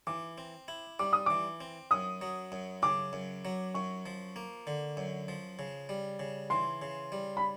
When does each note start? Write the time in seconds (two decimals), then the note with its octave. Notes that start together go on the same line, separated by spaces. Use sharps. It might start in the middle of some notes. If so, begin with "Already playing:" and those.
0.07 E3 D6
0.38 C4
0.68 E4
0.99 G3 D6
1.13 D#6
1.26 E3 D6
1.61 C4
1.91 F#2 D#6
2.21 F#3
2.52 F#2
2.83 C#3 D6
3.13 F#2
3.45 F#3
3.74 F#2 C#6
4.06 F3
4.36 A#3
4.67 D3
4.97 F#2
5.28 F3
5.59 C#3
5.89 G3
6.19 C#3
6.50 E3 C6
6.82 C#3
7.12 G3
7.37 B5